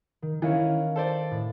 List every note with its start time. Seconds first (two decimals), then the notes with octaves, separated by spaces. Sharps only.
0.22 D#3
0.42 D#3 E3 C#4 F5 C#7
0.96 A4 C5 D5
1.31 A2